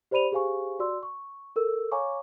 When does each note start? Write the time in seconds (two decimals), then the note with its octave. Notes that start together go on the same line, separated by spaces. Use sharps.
0.11 G4 C5 D5 B5 D#7 F7
0.32 G4 G#4 C5 F5 G#5 C#6
0.79 F#4 D5 C6 E6
1.03 C#6
1.56 A4 A#4 E6
1.91 C#5 F5 G#5 A#5 C#6 D6